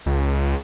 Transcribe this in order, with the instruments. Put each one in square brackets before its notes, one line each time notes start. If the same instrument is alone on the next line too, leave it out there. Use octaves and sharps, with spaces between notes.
[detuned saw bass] C#2